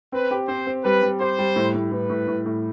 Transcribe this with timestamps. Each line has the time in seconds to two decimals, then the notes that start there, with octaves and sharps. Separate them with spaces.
0.12 C4 B4
0.31 G4
0.48 C4 C5
0.67 C4
0.84 G3 B4
1.02 G3
1.21 G4 C5
1.39 G3
1.56 A2
1.74 A2
1.92 A2 B4
2.10 A2
2.28 A2
2.46 A2